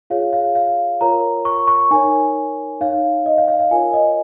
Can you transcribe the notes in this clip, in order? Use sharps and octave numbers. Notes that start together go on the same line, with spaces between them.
F4 G#4 C#5 F5
F5
F5
F4 A#4 C#5 A#5
C#6
C#6
D#4 A#4 C#5 G#5
D#4 C#5 F5
D#5
F5
F5
F5
F4 A#4 C#5 G#5
D#5